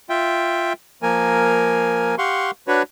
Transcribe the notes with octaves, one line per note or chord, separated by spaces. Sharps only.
F4 E5 G5
F3 A#3 A#4 G#5
G4 F5 F#5 C6 C#6
D4 F#4 B4 C#5